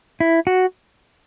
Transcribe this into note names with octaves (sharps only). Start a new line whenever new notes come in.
E4
F#4